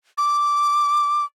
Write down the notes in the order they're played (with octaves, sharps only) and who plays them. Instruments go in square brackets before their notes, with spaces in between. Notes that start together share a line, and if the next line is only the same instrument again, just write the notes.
[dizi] D6